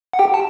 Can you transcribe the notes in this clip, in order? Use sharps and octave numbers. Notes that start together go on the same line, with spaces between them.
F#5
G4 G5
A5